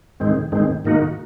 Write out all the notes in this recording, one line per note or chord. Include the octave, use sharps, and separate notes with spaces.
G#2 D#3 G#3 C4
G#2 D#3 G#3 C4
G#2 D#3 A#3 D#4 F#4